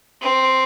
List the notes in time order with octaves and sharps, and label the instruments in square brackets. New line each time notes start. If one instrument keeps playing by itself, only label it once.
[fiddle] C4